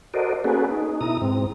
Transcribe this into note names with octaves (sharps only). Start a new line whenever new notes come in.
F#4 A4 A#4 C5 D5 D#5
A#3 C#4 F#4 G#4 A4 B4
D#4
B2 E4 A#5 D#6
G#2 C4